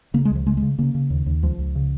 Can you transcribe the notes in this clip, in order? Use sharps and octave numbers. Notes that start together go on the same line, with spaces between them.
C#3 A#3
G#3
C#2 F3
C#3 G#3
G#3
C#3
C#3 A#3
C#3
D#2
D#2
C#2 F3
C#2
C#3